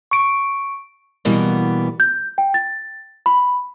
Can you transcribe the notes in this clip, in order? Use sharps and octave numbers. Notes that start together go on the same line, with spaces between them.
C#6 D7
B2 E3 G3 A#3 B3
G6
G5
A6
B5